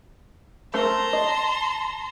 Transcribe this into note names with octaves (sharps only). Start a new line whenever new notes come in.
A3 C4 A#4 A5 A#5 C6
D#5